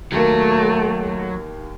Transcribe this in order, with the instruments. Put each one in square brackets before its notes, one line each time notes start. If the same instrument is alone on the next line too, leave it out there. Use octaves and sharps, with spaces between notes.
[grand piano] D#2 A#3 [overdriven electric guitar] F#3 [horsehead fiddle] A3